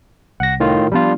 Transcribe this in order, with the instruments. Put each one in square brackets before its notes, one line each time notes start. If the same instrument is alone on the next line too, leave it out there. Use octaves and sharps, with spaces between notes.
[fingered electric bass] C2 [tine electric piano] F#5 A#6
[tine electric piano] A2 D#3 F4
[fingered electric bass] F3 B3 [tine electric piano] G3 D4 F4